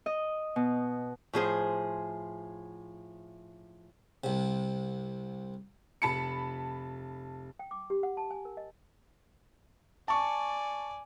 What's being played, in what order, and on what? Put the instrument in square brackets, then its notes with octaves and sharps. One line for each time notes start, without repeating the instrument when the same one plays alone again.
[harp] D#5
B2
[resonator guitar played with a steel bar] A2 F3 G#4 C5
[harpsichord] C2 C3
[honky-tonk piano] F1 A5 B5 C#7
[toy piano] G5
D6
G4
F#5
A5
G#5
A#4
D#5
[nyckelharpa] D5 G#5 [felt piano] A5 C#6